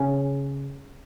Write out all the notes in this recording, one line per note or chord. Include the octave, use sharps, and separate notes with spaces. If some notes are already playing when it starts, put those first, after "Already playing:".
Already playing: C#3